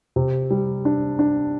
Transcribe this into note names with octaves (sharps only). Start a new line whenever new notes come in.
C3
G3
D4
D4